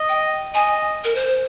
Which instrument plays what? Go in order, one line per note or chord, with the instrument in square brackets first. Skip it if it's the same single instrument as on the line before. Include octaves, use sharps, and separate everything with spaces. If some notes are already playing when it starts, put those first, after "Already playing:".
Already playing: [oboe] D#5
[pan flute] G5
[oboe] D#5 [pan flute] G#5
[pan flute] A#4
C5